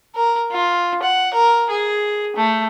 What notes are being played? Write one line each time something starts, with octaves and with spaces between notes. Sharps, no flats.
A#4
F4
F#5
A#4
G#4
A3